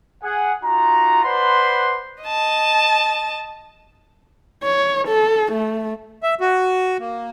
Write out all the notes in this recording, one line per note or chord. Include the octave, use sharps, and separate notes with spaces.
G#4 F#5
D#4 F4 F#4 A#5
B4 C5 D5 F#5 B5 C6
D#5 A5
C#5
A4
A3
E5
F#4
A#3